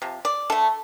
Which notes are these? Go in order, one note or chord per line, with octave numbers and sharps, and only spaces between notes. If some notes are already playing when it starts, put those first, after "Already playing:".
C3 F3
D5
D3 A3 A4